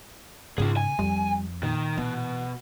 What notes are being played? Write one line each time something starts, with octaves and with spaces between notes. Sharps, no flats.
G#2 C#3 D#4 F4 G#4
G#5
F2 G3
A#2 D#3
B2 E3